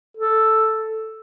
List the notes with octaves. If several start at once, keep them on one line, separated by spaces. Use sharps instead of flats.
A4